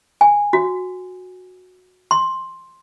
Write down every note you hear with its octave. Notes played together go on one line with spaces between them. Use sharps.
G#5
F#4
C6